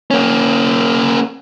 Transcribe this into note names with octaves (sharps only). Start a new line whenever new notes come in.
A#3 C#4